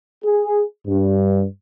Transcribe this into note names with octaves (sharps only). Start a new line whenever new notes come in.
G#4
G2